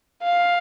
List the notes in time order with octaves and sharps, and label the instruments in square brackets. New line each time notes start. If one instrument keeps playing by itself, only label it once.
[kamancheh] F5